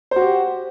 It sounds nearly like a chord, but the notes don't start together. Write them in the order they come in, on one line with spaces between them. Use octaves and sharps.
C5 F#4 G4